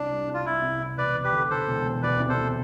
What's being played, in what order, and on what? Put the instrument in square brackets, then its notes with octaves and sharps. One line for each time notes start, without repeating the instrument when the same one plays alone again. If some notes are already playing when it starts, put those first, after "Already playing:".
Already playing: [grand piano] C2 [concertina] D4
[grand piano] G3
C2
[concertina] F4
[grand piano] C2 [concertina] E4
[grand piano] C2
C2
[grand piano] E1 [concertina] B4 D5
[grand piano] E1
[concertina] G4 B4
[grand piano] D3
[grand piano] D3 [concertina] A4 C5
[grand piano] E1
E1
[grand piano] D2 [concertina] B4 D5
[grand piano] C3
[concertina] A4 C5
[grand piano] D2